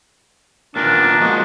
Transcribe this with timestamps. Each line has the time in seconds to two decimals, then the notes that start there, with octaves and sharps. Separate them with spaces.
0.76 A#2 D#3 B3 D4 A#4
1.20 F3 G#3 A#3 F#4 D#5